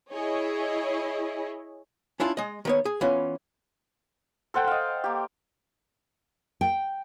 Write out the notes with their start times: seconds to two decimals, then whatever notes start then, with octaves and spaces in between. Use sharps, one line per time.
0.13 E4 G#4 C#5 D#5
2.20 C#4 D4 E4 F4
2.37 G#3 D#5
2.65 D#3 B3 C#5
2.85 G#4
3.01 E3 B3 C#4 F4
4.54 A4 C5 F#5 G5
4.67 D#5 F5
5.04 A#3 G4
6.61 G5